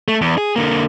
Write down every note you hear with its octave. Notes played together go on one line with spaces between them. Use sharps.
A3
E2
G#4
D3 A#3